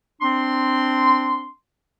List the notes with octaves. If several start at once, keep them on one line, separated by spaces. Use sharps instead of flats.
C4 D4 C6